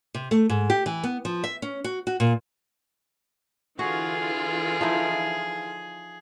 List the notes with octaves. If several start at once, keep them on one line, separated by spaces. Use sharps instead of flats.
C3
A3
G#2
G4
E3
B3
F3
E5
C#4
F#4
F#4
A#2
D3 E3 F4 F#4 G#4
F3 D#4 E4